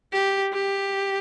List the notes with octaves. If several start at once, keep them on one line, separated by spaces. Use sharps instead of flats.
G4
G4